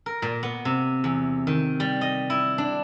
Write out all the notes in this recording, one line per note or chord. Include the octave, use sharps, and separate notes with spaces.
A#4
A#2
B3
C3
E2
D#3
G3
D#5
E4
D4